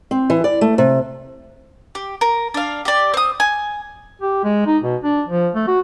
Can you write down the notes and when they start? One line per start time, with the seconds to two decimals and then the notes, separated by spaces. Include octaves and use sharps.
0.11 C4
0.30 E3
0.44 D5
0.61 A3
0.78 C3
1.95 G4
2.21 A#4
2.54 D4 F5
2.85 G4 D5
3.14 C4 D#6
3.40 G#5
4.21 G4
4.44 G#3
4.66 D#4
4.83 B2
5.04 D4
5.28 F3
5.55 A3
5.68 F#4